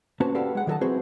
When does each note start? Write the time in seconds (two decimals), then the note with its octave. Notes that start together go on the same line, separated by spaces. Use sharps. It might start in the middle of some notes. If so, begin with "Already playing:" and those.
0.20 A#3 C#4 F#4 B4 C5 A5
0.35 F#4 G4 A4 B4 D5 F5
0.55 G#3 F#5
0.67 D#3 F#3 G#4 A4 D#5 A5
0.81 C4 E4 F#4 G#4 B4 C5